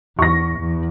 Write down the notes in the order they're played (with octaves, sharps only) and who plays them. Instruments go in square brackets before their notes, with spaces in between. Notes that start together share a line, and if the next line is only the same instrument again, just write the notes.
[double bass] E2 [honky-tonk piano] C#6 A#6
[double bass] E2